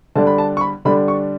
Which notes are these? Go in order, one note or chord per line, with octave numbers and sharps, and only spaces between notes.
D3 G3 D4 A5
B5
A5
C#6
B5
D3 G3 D4 B5
C#6